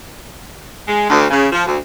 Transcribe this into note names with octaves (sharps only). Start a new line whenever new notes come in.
G#3
D2
C#3
F3
D2